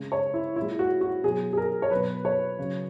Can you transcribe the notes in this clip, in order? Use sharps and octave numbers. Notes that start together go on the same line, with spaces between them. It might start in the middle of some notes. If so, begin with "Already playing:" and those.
Already playing: C#3 G#3
C#5
E4
A#2 E4
G#3
F#4
F#4
B2 F#3 G#4
G#4
A#4
C#5
B2 F#3 B4
C#5
C#3 F#3